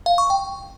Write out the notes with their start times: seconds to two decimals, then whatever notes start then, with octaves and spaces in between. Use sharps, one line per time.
0.06 F5
0.18 C#6
0.30 G5